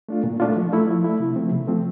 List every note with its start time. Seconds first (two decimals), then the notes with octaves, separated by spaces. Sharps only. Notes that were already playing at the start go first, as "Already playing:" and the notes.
0.09 A3 D4 F4
0.24 A#2
0.40 A3 D4 F4
0.56 F3
0.73 A3 E4
0.88 F3
1.04 A3 E4
1.20 C3
1.36 F3 A3 C4
1.51 C3
1.68 F3 A3 C4